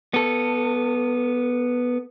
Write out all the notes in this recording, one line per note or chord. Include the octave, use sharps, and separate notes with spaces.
B3 A4